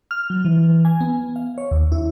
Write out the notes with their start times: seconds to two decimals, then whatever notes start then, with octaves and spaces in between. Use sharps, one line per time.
0.11 F6
0.30 F#3
0.45 E3
0.85 G#5
1.00 B3
1.36 F5
1.58 C#5
1.71 D#2
1.92 E4